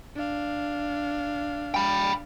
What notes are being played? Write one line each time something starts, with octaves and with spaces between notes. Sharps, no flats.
D4 F5
G5 B5